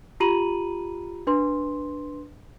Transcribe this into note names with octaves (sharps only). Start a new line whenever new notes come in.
F4 G4 A#5 B5 D#7 F#7
D4 B4 C6